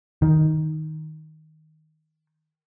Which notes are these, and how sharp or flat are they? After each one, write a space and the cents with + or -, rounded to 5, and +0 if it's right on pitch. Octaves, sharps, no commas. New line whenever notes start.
D#3 +5